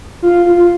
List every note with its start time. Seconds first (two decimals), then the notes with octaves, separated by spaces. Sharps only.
0.22 F4
0.46 F4
0.56 F4